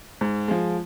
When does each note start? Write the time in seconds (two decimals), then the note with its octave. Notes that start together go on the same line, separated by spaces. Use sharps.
0.21 G#2
0.48 F3 G#3